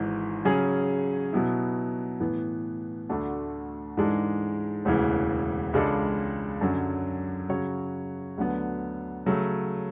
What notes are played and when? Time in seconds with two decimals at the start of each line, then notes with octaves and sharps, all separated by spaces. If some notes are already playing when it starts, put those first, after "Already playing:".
Already playing: G#1 G#2 E3
0.45 C#3 F#3 C#4 G#4
1.33 B2 F#3 B3 E4
2.20 A2 E3 B3
3.09 D2 D3 A3 D4 F#4
3.97 G#2 E3 G#3 D4 A4
4.85 E1 D2 C#3 E3
5.73 C#2 C#3 G#3 D4 A4
6.61 F#2 D3 F#3 C#4
7.49 C#3 F#3 C#4 F#4 C#5
8.38 D2 D3 F#3 B3
9.26 C#3 F#3 A3